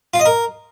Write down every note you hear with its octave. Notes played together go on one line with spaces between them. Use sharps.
F4
D#5
A#4